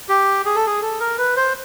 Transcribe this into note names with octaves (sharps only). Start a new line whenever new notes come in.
G4
G#4
A4
G#4
A4
A#4
B4
C5